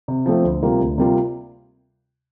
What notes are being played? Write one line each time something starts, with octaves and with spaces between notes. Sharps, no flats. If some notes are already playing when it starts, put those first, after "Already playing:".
C3
F3 A3 C4
D2
C3 G3 A#3 F4
D2
C3 G3 A#3 F4